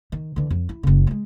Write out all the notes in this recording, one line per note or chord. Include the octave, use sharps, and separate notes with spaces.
D#3
D3 E3
F2
E4
F#1 C#3
F#3 G#3